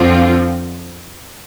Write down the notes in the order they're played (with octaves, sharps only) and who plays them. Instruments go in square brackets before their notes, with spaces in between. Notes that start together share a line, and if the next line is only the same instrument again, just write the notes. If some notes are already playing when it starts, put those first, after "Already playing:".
Already playing: [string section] F2 D3 F3 C4 F4